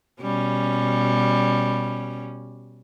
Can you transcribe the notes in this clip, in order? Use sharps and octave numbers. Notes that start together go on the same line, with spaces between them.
B2 G3 C#4